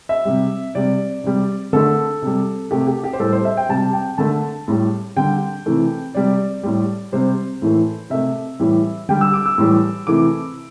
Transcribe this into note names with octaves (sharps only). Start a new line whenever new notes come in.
E5
C3 G3
C3 G3 D5
C3 G3
D3 A3 A4
C3 G3
C3 A3 G4
G4
G4
C5
A2 G3 A4
C5
E5
G5
C3 G3 A5
G5
D3 A3 A5
A2 G3
D3 G3 G5
C3 E3 A3
C3 G3 D5
A2 G3
C3 G3 C5
A2 E3 A3
C3 A3 E5
A2 E3 G3
D3 G3 G5
E6
D6
E6
A2 E3 G3
C3 E3 A3 D6